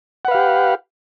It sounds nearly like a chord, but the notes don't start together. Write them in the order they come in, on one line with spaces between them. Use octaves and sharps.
F#5 B4 F5 G4